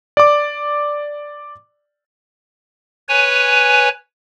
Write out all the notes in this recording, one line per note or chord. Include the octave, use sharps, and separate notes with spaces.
D5 D6
B4 C#5 G#5